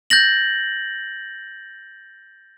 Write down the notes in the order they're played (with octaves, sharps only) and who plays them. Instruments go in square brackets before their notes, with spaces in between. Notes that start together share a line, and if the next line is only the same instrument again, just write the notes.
[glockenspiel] G6 A6 A#6 F#7